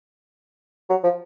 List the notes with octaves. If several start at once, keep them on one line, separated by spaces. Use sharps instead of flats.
F#3
F3